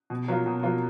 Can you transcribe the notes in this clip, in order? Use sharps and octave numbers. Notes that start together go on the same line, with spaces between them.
B2
F#3 A#3 F4
B2
F#3 A#3 F4